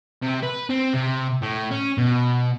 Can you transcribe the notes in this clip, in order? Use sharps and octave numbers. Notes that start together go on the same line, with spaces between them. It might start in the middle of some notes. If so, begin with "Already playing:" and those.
C3
B4
C4
C3
A2
C#4
B2